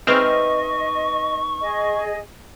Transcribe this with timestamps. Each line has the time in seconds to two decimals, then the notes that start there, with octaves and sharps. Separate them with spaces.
0.07 G#3 C4 D#4 B4 D#5 E5 C#6 F6
1.61 G#4 D#5